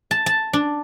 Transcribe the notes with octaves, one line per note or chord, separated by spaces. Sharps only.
A5
A5
D4